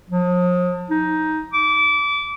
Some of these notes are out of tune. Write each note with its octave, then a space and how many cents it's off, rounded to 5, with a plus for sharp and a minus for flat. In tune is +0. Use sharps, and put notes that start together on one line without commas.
F3 +40
D#4 +10
D6 -25